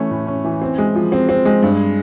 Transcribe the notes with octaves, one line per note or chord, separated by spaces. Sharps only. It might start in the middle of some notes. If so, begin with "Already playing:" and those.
Already playing: E3 A3 C#4
A2
C#4
E3
C4
G#3
F3
C4
C4
G#3
G2